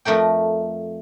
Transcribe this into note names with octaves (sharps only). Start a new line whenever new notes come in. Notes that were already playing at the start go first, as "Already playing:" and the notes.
F2 A3 A#4 G5